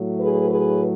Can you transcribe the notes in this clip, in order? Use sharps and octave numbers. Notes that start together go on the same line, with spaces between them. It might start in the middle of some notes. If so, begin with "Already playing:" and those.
Already playing: A2 F#3 A3
G#4 B4
G#4 B4